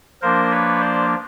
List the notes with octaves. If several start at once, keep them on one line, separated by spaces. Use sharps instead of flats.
F3 A#3 D4 A#4 C5
B4 C#5
C5 D5